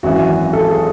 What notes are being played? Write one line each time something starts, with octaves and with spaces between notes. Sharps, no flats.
G#1 F#2 E3 F#4
A4
G#4